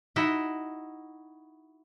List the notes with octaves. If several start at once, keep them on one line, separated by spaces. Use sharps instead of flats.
D#4 E4 F#4 D#5 E5